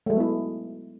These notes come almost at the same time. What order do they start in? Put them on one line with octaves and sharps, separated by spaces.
A3 G#3 F#3 B3 E4